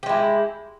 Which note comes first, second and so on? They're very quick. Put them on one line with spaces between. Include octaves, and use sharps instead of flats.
G4 G#3 E4